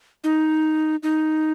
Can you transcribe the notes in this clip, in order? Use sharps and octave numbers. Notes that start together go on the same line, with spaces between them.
D#4
D#4